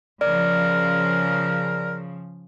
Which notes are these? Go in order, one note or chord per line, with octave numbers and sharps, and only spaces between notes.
C#3 F3 A#4 D5